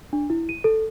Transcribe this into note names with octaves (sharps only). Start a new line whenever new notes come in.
D4
E4
D#7
A4